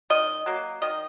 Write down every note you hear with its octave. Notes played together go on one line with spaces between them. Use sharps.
D#3 D#5
F#3 A#3
D#3 D#5